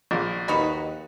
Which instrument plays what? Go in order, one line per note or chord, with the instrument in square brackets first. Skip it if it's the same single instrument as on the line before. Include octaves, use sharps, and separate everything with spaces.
[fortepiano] A#1
[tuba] D#2 [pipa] D#4 F#4 B4 [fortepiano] D#5